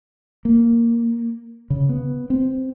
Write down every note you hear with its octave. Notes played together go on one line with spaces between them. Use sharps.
A#3
C#3
B3
C4